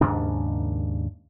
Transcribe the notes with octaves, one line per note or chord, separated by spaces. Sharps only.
D#2 G#2 C#3 D4